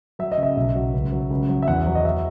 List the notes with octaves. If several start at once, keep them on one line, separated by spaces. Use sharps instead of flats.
F#3 E5
D#5
C#3
E5
B1
F#3
C#2
F#3
C#2
F#3
E5
E2 F#5
F#3
D#5
E5